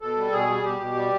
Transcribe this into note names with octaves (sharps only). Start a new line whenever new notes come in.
B2 A4
G3
B2 G#4
G3
B2 G4
B2
G3